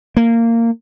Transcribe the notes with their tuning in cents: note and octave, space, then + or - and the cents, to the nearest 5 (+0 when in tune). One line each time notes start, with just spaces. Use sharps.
A#3 -15